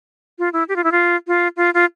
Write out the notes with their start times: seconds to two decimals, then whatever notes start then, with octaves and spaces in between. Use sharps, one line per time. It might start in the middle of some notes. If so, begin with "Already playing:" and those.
0.39 F4
0.53 E4
0.69 G4
0.76 F4
0.84 E4
0.92 F4
1.27 F4
1.57 F4
1.74 F4